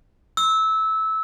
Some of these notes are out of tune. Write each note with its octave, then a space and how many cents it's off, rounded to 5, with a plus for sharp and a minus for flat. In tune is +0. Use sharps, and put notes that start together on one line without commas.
E6 -20